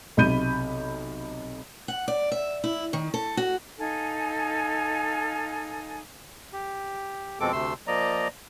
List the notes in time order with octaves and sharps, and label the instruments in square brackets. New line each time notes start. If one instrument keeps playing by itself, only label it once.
[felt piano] B1 C3 B5 G6 D#7
[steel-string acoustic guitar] F#5
D5
E5
E4
D#3
A4
F#4
[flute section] D#4 A4 F5 G#5
[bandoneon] G4
F2 B2 G#3 C4 A4 D6
D2 C3 A3 C6 E6
F3 A#3 D5 D#5 A#5